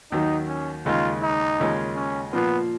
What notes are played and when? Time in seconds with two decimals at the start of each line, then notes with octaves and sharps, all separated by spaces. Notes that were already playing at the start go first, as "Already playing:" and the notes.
0.11 D#2 D#3 F#3 D#4
0.48 C#4
0.86 D#2 C#3 G#3 D#4 F4
1.22 D#4
1.60 D#2 C#3 G#3 C#4 F4
1.96 C#4
2.33 A#2 F3 A#3 B3 F4